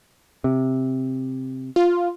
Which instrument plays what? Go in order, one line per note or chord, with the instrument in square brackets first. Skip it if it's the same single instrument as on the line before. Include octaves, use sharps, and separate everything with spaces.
[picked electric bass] C3
[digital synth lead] F4